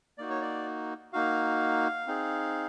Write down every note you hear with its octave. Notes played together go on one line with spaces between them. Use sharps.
A#3 D#4 F#4 D5
C#5
D5
A#3 D#4 F#4 F5
C4 D#4 G#4